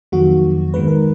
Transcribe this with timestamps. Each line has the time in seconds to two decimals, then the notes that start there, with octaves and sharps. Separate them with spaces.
0.12 F2 D#3 F#3 A#3 F#4
0.74 G#2 D#3 G#3 B3 B4
0.88 A#4